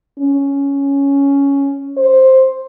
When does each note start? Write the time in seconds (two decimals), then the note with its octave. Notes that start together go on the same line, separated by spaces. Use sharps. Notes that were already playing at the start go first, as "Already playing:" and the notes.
0.18 C#4
1.97 C5